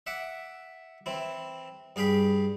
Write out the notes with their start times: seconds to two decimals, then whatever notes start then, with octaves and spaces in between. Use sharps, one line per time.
0.07 E5 F#5 D6
1.06 E3 C4 E4
1.96 G2 G#4 F5 G5 B5